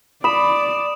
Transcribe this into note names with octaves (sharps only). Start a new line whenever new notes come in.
D5 B5 D#6 E7